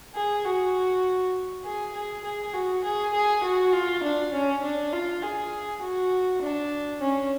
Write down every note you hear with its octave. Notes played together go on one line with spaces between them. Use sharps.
G#4
F#4
G#4
G#4
G#4
F#4
G#4
G#4
F#4
F4
D4
C#4
D4
F4
G#4
F#4
D4
C#4